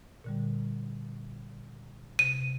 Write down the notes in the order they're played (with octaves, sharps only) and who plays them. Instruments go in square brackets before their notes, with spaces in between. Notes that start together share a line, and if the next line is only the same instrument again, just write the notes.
[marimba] A#2 D3 G3
[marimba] C3 [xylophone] D#7